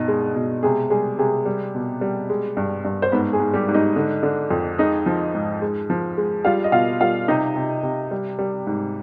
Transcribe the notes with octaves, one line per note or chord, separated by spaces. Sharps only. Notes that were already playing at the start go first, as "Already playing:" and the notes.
Already playing: G2 B2 D#4 D#5
G#3
B2
C3 G#3 G#4
G3 G#3 G#4
C3 G#3 G#4
G3
B2
G3
G#3
G2
G2
C5
G#2 B3 B4
G#3 G#4
G#2
G3 G4
G#2
D#4 D#5
D3
D3
F2
G#3 D#4 D#5
F3
G#2
G#3
F3
G#3
G3 F4 F5
D#5
B2 F4 F5
G3 F4 F5
C3 D#4 D#5
C3
C3
G3
G3
G#2